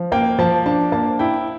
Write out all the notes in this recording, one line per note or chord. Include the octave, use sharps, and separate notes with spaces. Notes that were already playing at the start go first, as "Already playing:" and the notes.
Already playing: F3
A#3 G5
F3 A5
D4 A5
A#3 A5
E4 G5